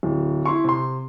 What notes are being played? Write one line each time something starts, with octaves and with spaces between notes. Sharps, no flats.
D1
E4 C6 C#6
C3 C6